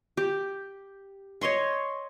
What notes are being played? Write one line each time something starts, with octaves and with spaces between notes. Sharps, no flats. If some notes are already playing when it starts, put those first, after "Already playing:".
G4
C#5 D#5 C6 C#6